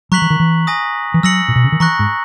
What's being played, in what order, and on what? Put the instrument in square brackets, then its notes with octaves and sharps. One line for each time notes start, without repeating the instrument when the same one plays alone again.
[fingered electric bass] F#3 [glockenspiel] A#5 C#6 F#6 B6 F#7
[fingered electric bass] E3
D#3
E3
[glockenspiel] G#5 D#6 A#6
[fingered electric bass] E3
[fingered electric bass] F#3 [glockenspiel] E6 A#6 C#7 F#7
[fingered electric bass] A#2
B2
C#3
D#3
[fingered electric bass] E3 [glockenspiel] A#5 C#6 F#6 A#6
[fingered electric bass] G#2